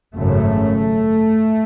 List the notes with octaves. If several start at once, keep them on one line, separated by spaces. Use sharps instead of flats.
G#1 F#2 C#3 A3